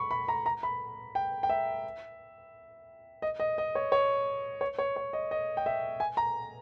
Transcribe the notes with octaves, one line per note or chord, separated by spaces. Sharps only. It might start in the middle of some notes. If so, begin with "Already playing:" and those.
Already playing: B5 C#6
B5
A#5
A#5
B5
G5
G5
E5
D#5
D#5
D#5
C#5
C#5
C#5
C#5
C#5
D#5
D#5
G5
E5
G#5
A#5